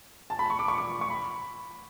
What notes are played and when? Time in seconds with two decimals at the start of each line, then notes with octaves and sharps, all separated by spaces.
0.30 A5
0.39 B5
0.50 C#6
0.59 D6
0.68 C#6
0.78 D6
1.01 C#6
1.10 B5